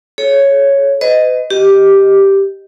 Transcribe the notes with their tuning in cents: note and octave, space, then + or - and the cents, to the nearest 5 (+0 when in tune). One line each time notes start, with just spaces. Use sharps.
A4 -45 C#5 +0
B4 +45 D#5 +0
G4 +0 D#5 +0